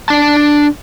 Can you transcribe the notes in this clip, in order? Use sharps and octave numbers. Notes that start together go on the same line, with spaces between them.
D4 A5